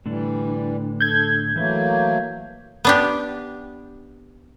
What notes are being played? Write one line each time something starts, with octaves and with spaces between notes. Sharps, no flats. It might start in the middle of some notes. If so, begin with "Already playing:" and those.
A2 D3 E3 G3 D4
A4 G6 G#6
E3 F#3 A3 A#3 B4
B3 D4 G4